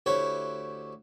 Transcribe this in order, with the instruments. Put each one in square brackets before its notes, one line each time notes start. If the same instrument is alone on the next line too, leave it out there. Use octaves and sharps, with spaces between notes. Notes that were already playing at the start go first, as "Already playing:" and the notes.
[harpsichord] D2 E4 G4 C5 C#5